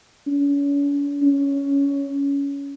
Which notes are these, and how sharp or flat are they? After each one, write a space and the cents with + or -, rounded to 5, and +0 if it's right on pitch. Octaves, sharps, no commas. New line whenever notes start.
C#4 +40
C#4 +15